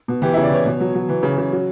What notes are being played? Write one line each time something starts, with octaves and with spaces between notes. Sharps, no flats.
B2
E3 G4
C#3 E4
D5
E3 C#5
B2
F#3
F#3
E3
C#3
C#3
F#3